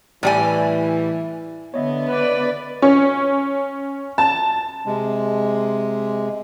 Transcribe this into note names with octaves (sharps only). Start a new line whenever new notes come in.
A2 E3 G3 G#5
D3 B3 C#5 D#5 E5
B4 D5
C#4
A5
C3 G#3